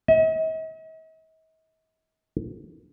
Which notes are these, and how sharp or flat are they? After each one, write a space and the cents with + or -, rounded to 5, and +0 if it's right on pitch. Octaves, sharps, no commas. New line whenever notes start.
D#5 +45